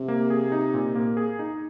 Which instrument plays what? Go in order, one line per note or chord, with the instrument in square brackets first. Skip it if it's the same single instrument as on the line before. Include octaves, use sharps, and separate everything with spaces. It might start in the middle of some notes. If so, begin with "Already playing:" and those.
Already playing: [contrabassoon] C3
[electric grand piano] A#3
G#4
D#4
A#2
A#3
G#4
D#4